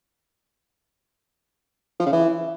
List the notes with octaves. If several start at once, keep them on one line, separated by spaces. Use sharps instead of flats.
F3
C#3
E3